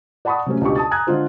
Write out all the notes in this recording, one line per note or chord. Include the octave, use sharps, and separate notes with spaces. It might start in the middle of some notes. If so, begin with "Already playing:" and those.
D5 F#5 A5 B5 C#6 D#6
C3 F#3 A3 C#4
C#2 B2 D4 G4 C#6
A5 D#6 A6
G#5 A#5 D#6 F#6 G#6
D3 G#3 D4 F4 C5